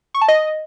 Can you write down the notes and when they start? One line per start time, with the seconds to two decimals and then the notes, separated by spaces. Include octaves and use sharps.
0.14 C#6
0.21 A5
0.28 D#5